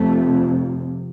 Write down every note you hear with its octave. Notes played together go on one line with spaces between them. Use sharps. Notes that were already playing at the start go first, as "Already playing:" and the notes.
Already playing: F1 F2 C3 A3